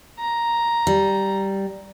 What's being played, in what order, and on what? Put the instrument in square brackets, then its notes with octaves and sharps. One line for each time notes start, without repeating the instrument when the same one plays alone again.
[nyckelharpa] A#5
[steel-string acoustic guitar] G3